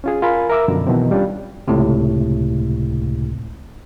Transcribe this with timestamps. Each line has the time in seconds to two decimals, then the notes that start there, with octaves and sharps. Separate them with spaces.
0.04 C#4 F4 G#4
0.22 F4 A#4 G#5 B5
0.49 A#4 E5 D6 E6
0.68 F#2 B2 D3 F3
0.87 B2 D#3 E3 F#3 C4
1.11 G3 C#4 D4 F4
1.68 C#2 A2 C3